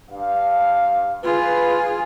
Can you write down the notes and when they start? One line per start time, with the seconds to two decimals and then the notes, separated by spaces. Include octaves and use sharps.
0.11 G2 F5
1.24 F4 G#4 B4